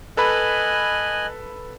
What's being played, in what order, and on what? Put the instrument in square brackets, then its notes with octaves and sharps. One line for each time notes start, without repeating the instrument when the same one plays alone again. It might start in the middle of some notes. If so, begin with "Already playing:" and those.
[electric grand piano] A4 B4 B5 [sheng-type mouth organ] D#5 G#5 F#6